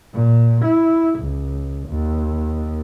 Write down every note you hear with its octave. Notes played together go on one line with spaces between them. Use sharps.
A#2
E4
C#2
D#2